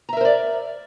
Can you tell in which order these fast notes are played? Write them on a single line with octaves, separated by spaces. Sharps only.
A#5 E5 A#4 C5 D5